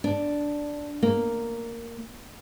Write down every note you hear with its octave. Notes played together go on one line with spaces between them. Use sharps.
D4
A#3